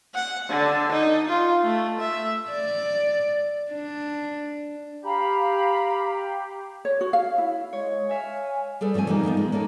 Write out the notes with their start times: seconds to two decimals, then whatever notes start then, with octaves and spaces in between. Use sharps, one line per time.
0.14 F#5
0.49 D3
0.92 D#4
1.28 F4
1.64 A3
2.00 E5
2.51 D5
3.71 D4
5.04 G4 F5 A#5 B5
6.85 C#5
7.01 F#4
7.13 F5
7.38 E4
7.73 G#3 C#5
8.09 C#5 E5 F5 G#5
8.81 G3 G#4 A4 B4
8.94 G2 F3 A3 C4 G#5
9.07 E3 F3 G3 A#3 D#4
9.23 F3 G3 B3 D#4
9.37 G#3
9.52 A#3 C#4 D#4 A4